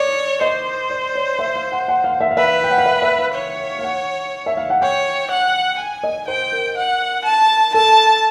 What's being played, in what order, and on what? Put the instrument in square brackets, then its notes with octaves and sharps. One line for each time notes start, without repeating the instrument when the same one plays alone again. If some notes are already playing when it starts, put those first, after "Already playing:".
Already playing: [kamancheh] C#5 [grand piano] D5
[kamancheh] C5 [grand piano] D#5
[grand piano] D5
C#5
E5
F5
F#5
F#5
F5
E5
F5
[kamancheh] B4 [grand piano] E5
[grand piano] G5
F#5
F5
E5
E5
F5
[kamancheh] C#5
[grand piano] F5
F#5
E5
F5
F#5
[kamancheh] C#5 [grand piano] G5
[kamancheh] F#5
G#5
[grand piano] D#5
[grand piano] C5 [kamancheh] G5
[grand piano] A#4
[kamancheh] F#5
A5
[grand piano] A4 [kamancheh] A5